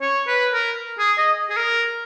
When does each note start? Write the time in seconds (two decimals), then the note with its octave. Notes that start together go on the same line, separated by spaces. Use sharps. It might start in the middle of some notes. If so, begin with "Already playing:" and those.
0.01 C#5
0.27 B4
0.53 A#4
0.99 G#4
1.18 D#5
1.50 G#4
1.57 A#4